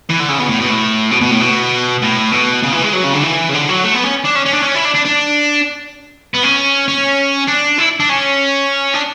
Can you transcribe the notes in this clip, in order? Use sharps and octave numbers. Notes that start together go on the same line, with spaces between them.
E3
D3
C#3
B2
A2
B2
A2
B2
B2
A2
B2
A2
B2
C#3
E3
G#3
F#3
C#3
D3
E3
C#3
D3
F#3
A3
B3
C#4
D4
C#4
C#4
D4
C#4
E4
D4
D4
D4
B3
C#4
C#4
D4
E4
D4
C#4
D4